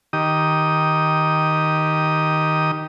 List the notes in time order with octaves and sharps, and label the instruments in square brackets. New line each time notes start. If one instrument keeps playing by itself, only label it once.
[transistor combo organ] D#3 G4 D#6